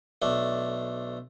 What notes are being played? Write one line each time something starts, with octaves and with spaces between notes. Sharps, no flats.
B1 A3 D4